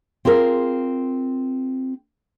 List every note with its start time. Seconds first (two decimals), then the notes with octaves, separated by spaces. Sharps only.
0.25 C4 F4 G#4 A#4